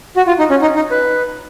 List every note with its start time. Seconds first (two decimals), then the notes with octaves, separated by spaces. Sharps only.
0.16 F#4
0.27 F4
0.39 D#4
0.50 C#4
0.62 D#4
0.76 D#4
0.91 B4